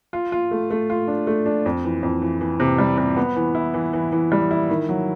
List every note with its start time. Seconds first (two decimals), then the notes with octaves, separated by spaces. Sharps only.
0.13 F4
0.32 F4
0.51 A3
0.70 A3
0.90 F4
1.07 D4
1.27 A3
1.46 D4
1.66 F2
1.85 E3
2.03 F2
2.22 E3
2.41 E3
2.60 C3
2.79 G3
2.98 C3
3.17 B3
3.36 E3
3.55 E4
3.74 E3
3.93 E3
4.12 E3
4.32 G3
4.51 E4
4.70 D#3
4.89 F#3